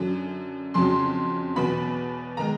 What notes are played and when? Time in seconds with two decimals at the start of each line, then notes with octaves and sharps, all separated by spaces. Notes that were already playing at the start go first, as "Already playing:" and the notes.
Already playing: F#2 D3 F#3
0.74 F2 C#3 F#3 C6
1.56 E2 B2 F#3 B3 B5
2.37 D#3 G#3 A#5